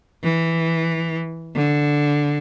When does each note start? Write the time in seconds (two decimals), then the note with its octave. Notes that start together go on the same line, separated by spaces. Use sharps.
0.23 E3
1.55 D3